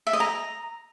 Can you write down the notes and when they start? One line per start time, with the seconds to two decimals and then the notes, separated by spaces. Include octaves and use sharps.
0.07 E5
0.13 D#5
0.20 A#5